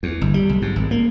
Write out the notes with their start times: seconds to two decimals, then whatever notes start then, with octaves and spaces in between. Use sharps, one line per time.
0.03 E2
0.21 G1
0.34 G3
0.49 B1
0.62 G#2
0.76 G#1
0.91 A#3